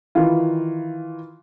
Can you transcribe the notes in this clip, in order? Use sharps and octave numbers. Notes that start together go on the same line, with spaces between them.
D#3 E3 F4